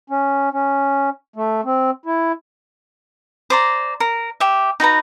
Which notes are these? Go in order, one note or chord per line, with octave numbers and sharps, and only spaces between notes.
C#4
C#4
A3
C4
E4
C5 D5 A#5
A#4
G4 E5
D#4 F#4 B4 A#5